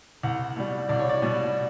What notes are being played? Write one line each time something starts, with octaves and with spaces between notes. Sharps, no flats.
C2 F#5
B2 G3
C2 D5
C#5
D5
B2 G3